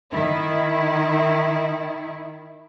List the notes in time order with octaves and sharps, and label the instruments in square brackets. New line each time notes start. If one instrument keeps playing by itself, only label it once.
[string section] D#3 E4